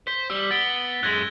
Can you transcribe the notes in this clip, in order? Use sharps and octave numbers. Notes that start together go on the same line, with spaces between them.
C5 B6
G3 E6
B3 A6 D7 G7
F#2 G#3 F#6 G#6 A#6